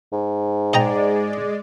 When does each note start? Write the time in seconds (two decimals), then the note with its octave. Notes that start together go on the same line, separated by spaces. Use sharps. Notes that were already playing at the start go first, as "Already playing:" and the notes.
0.12 G#2
0.73 G#3 D5 D#5 G5 A#5